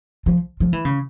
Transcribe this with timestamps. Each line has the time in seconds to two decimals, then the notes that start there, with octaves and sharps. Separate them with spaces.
0.26 F3
0.60 F3
0.73 E3
0.85 C#3